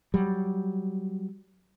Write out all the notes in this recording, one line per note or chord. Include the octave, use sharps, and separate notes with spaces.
F#3 G3